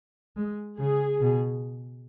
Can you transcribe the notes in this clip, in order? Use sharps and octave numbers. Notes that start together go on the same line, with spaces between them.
G#3
C#3 G#4
B2